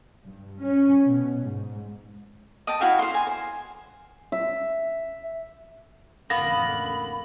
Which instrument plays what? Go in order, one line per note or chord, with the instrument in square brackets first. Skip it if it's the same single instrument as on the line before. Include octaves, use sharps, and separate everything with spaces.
[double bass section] G2
C#4
B2
G#2
[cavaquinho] D#5 G5 A5
E4 F#4 F5 G5
C5 C6
G#5
C5
[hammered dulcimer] E5
[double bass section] A1 F2 D3 [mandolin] A#3 B3 [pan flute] B5 [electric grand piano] A#6